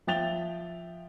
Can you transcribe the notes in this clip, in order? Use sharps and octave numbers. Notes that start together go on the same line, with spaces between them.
F3 E5 G5 A6 F7 G7